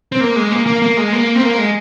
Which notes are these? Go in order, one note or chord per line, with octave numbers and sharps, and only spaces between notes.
C4
A#3
G#3
A#3
A#3
A#3
G#3
A#3
C4
A#3
G#3